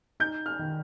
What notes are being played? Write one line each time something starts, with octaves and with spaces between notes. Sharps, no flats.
D#4 G6
F6
D#3